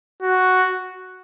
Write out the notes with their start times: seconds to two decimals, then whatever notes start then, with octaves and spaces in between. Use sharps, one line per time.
0.22 F#4